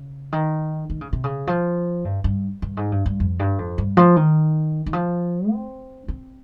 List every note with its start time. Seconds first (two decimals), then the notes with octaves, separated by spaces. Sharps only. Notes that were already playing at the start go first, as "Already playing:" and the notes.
Already playing: C#3
0.32 D#3
0.90 D#3
1.01 C#3
1.13 C3
1.24 C#3
1.47 F3
2.05 G2
2.24 G2
2.62 G2
2.77 G#2
2.92 G2
3.06 G2
3.20 F2
3.39 G2
3.59 F2
3.78 G2
3.97 F3
4.16 D#3
4.86 D#3
4.93 F3
5.51 C4
6.08 C4